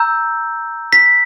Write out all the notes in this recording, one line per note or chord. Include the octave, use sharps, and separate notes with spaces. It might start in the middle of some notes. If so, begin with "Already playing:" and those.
Already playing: A#5 E6 G6
B6